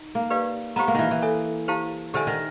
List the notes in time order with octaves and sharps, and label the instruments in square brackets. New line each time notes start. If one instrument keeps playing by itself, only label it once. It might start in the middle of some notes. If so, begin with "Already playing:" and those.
Already playing: [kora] D#4
A#3
[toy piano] G4 B4 D5 F5
[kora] B3 [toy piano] G4 C5 F5 A#5
[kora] A#3
D#3 E3
E3
[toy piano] A4 C#5 E5 G#5
E4 G4 C5 F5 A5
[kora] D3 [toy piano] G4 C5 E5 G#5
[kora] D#3